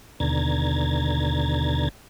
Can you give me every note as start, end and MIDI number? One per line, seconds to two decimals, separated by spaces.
0.20 1.89 39
0.20 1.89 47
0.20 1.89 50
0.20 1.89 82
0.20 1.89 92
0.20 1.89 93